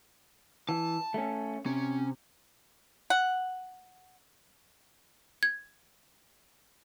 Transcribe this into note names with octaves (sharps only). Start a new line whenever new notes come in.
E3 A5
A3 C#4
C3 C#4
F#5
G#6